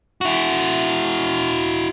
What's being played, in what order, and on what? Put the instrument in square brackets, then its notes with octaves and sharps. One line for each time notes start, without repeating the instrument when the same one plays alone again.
[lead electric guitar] E4 F#4